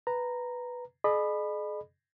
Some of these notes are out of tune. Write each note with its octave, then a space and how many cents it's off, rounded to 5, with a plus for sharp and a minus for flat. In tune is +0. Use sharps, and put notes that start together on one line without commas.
B4 +0 A#5 -5
G#4 +40 D#5 -45 B5 +0